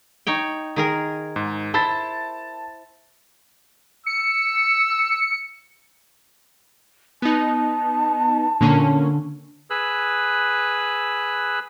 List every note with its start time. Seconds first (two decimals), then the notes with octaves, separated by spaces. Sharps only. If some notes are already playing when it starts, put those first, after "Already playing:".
0.27 D#4 C#5 G5
0.76 D#3 G#4 A#4
1.36 G#2
1.74 E4 C5 A5 A6
4.06 E6 C#7
7.22 B3 D#4 A5
8.61 A#2 D3 A#3 C#4
9.70 G#4 B4 E6 F#6